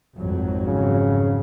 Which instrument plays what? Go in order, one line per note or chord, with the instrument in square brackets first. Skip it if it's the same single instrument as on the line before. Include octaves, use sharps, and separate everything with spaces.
[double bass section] G#1 F2 F#3
[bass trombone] C#3